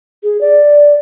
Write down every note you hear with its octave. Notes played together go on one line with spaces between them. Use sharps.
G#4
D5